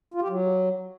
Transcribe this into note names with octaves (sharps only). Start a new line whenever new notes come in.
F4
G4
F#3